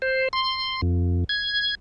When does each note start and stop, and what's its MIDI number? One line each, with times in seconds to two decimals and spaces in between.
0.02 0.28 72
0.33 0.81 84
0.82 1.24 41
1.29 1.75 92